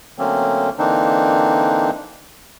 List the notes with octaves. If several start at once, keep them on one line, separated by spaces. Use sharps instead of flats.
D3 F#3 A3 A#3 C4 C#4
D3 E3 A#3 C4 D4 D#4